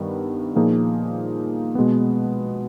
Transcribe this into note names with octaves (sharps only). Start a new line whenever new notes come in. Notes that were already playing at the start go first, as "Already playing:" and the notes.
Already playing: G2 D#3 G3 B3
A#2 F3 A#3 D#4 G#4
B2 G#3 B3